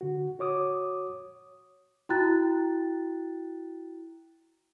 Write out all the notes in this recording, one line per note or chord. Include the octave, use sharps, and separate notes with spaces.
D3 F#4
F#4 C#5 D6 D#6
E4 F#4 G5 A#5 F#6 A6